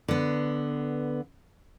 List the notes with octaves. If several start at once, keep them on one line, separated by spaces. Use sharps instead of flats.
D3 B3